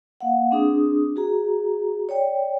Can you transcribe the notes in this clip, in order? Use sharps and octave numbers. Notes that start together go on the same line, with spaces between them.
A#3 F5 F#5
C4 D4 G#4 D#6
F#4 G#4 A#5
C#5 D5 G5